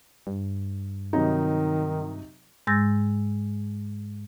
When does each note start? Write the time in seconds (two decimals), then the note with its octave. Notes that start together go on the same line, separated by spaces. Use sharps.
0.27 G2
1.13 C3 D#3 F#3 D#4
2.67 G#2 G#3 E6 G6 A6 A#6